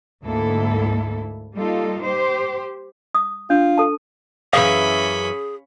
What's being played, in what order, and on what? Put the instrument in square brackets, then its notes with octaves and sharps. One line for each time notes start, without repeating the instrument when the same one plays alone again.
[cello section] D2 G#2 A#3 E4 A4
G3 A#3 D#4 F4 A4
G4 C5
[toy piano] D#6
[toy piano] D4 [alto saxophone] F4
[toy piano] A4 A5
[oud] F#2 E3 [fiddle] C#4 B5 [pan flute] G#4 [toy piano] F5